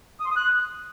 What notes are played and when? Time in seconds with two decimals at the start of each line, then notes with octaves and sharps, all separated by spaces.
0.20 D#6
0.25 C6
0.31 D#6
0.36 F#6